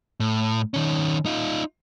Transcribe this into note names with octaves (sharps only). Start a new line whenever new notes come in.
A2
D#3 C#4
D#4 F4